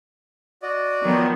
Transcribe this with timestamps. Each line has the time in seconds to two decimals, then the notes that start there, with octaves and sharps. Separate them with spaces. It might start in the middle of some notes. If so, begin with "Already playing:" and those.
0.62 F#4 D5 D#5
1.03 D#3 F3 F#3 B3